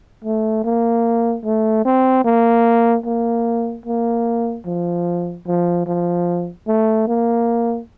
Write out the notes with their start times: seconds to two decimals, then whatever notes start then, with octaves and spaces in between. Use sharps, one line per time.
0.24 A3
0.64 A#3
1.45 A3
1.85 C4
2.24 A#3
3.05 A#3
3.86 A#3
4.66 F3
5.46 F3
5.87 F3
6.67 A3
7.07 A#3